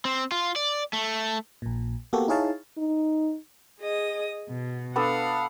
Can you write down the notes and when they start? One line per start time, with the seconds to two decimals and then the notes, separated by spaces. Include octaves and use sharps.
0.05 C4
0.32 F4
0.56 D5
0.93 A3
1.62 A#1 A#2
2.13 A#3 B3 F#4 G4 A4
2.28 D#4 E4 G#4 C#5 F5 A5
2.78 D#4
3.80 G#4 D#5 D#6
4.49 B2
4.96 B3 D4 A4 F5 F#5